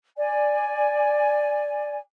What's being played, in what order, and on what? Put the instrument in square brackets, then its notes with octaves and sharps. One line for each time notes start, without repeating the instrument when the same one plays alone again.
[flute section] D5 G#5